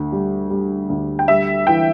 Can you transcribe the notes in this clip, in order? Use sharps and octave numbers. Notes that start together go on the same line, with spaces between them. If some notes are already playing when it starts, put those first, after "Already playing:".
Already playing: D2
G3
G3
D2
G5
G3 E5
E3 G5